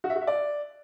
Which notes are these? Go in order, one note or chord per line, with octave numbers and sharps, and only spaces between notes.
F#4
E5
F#4
E5
D5